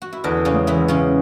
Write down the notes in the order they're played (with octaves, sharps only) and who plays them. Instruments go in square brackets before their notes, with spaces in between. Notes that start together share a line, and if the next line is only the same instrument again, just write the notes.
[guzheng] F#4
E4
[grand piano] E2 [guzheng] D3 D4
[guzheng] C#3 C#4
[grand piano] G#3
[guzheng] E3 E4
[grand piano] E2
[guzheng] C#3 C#4